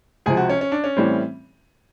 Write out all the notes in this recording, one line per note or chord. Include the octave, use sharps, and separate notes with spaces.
C#2 C3 F3 G#4
F#4
C#4
C#4
D4
C#4
A2 E3 G3 C4